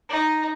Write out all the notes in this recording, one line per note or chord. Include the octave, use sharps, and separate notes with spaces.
D#4